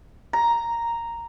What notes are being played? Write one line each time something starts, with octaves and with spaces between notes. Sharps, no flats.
A#5